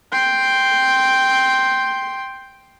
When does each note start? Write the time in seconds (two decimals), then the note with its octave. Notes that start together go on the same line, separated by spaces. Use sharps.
0.12 G5 C6